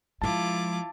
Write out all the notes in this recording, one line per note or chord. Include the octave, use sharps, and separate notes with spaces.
F3 G#3 E4 F4 A5 D6